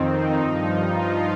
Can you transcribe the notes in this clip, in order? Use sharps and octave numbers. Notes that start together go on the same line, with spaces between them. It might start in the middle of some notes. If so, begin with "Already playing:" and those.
Already playing: F2 D#3 C4 D#4
G2 F3 D#4
F4